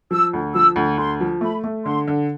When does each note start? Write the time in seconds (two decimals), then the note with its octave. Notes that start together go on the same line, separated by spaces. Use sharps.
0.11 F3 E6
0.33 D2
0.54 F3 E6
0.76 D2
0.98 D2 C6
1.21 F3
1.41 A3 B5
1.64 A3
1.85 D3 C6
2.07 D3